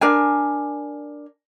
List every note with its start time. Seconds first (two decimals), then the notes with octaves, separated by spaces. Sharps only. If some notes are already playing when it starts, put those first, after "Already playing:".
0.01 D4 A#4 G#5